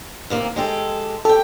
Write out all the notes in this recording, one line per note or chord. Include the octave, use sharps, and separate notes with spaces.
D#2 C3 A#3
G#3 G4 A4
G4 A4 G5